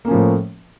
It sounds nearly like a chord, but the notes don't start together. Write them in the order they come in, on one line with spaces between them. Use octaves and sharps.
A#3 C#4 F3 A2 A3